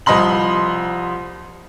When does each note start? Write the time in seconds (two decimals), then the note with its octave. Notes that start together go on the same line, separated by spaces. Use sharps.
0.06 C2 F3 D#5 B5 C6 F#7